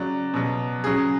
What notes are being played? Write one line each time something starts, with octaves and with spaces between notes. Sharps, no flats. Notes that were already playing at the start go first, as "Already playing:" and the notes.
Already playing: C#3 F#3 D5
B2 F#3
C#3 F#3 G#4